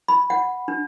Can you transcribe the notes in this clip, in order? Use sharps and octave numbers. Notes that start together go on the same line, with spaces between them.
B5
F#5
D4